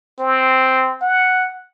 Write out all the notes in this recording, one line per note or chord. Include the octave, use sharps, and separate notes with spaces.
C4
F#5